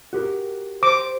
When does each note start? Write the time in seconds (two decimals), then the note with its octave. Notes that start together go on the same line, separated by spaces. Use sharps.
0.13 F#4 G4 A#4
0.83 C5 D6